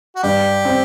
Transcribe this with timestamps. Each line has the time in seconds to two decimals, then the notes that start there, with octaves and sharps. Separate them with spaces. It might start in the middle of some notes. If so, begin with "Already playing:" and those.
0.16 F#4
0.23 G2 G4
0.65 C4